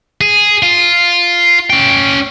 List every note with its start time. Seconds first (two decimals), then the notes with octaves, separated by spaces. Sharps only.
0.21 G#4
0.63 F4
1.70 C#4 G5